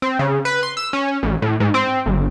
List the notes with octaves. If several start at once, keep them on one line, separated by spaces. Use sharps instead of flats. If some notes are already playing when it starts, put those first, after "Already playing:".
C4
C#3
B4
C6
E6
C#4
A1
A2
G#2
C4
G1